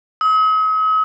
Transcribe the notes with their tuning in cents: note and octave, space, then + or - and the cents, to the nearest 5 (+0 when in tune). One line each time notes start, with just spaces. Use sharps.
D#6 +45